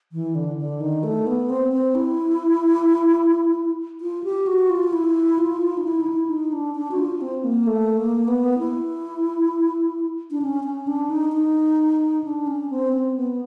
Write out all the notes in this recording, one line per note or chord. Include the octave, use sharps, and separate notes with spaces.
E3
D3
D3
D#3
A3
B3
C4
C4
E4
F4
G4
F#4
F4
E4
F4
D#4
E4
D#4
E4
D#4
D4
D4
F#4
F4
C4
A#3
A3
A#3
B3
E4
D4
C#4
C#4
D4
D#4
D#4
D4
C#4
C4
C4
B3